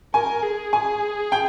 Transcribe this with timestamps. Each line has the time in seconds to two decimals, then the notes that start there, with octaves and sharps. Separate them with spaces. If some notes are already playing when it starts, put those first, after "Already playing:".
0.14 A#4 G#5
0.43 G#4
0.73 G#5
1.32 G5